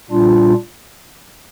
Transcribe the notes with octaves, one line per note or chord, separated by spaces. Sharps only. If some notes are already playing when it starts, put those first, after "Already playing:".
A#2 G3 D4 F4